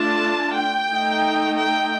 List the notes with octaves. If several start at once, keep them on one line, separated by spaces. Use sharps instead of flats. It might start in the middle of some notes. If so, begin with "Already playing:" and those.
Already playing: A3 D4 F4 A5
G5
A3 D#4
G5